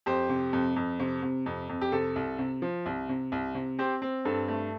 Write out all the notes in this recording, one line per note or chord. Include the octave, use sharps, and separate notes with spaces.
F2 G4 C5
C3
F2
F2
C3
C3
F2
F2
G4
C3 A4
C2
C3
F3
C2
C3
C2
C3
C4 G4 C5
C4
G2 A4
A3